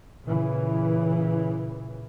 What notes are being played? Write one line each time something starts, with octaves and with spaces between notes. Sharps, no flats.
A#2 C#3 E3